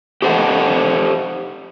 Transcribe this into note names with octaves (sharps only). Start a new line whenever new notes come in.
G4 A4 C5 D#5 F#5